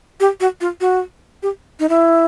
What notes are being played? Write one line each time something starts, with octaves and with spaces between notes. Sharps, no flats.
G4
F#4
F4
F#4
G4
D#4
E4